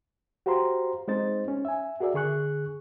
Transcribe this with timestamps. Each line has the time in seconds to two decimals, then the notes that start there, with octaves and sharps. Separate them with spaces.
0.46 F#4 G4 C5 F5 A#5 C6
1.08 G#3 C4 D#4 C5 A6
1.48 C#4
1.65 E5 G#5
2.00 F#4 G#4 A#4 D5 E5
2.14 D3 G#4 C#6 F#6